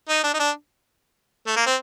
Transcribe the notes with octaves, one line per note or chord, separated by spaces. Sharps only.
D#4
D4
D#4
D4
A3
A#3
C4